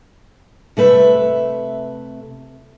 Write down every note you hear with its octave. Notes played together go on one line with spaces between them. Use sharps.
C3 A3 B4 E5